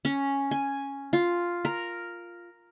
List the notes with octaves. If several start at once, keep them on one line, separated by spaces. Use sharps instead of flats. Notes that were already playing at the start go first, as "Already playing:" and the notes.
C#4
G#5
F4
A#4